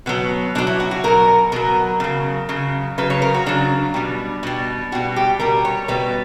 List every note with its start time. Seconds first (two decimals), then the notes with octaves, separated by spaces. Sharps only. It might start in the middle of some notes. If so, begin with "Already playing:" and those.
0.06 B2 F#3 B3
0.55 B2 F#3 D4
0.67 E4
0.80 F#4
0.91 F#4
1.04 B2 F#3 A#4
1.52 B2 F#3 A#4
2.00 C#3 F#3
2.49 C#3 F#3
2.98 C#3 F#3 B4
3.10 C#5
3.22 A#4
3.34 F#4
3.46 C#3 F#3 D4
3.94 B2 G3
4.43 B2 G3
4.92 B2 G3 F#4
5.16 G4
5.39 B2 G3 A#4
5.65 C#5
5.88 B2 G3 B4